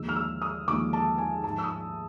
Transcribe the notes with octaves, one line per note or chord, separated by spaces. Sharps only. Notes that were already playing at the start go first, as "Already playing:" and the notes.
Already playing: D#2 D3 F3 G#3 E6
F6
E6
D#6
D#2 D3 F3 G#3 D6
A5
G#5
G#2 F3 G#3 A5
E6
D#6